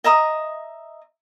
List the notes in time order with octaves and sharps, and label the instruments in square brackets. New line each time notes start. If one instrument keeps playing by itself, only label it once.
[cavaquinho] D#5 E5 A#5 D#6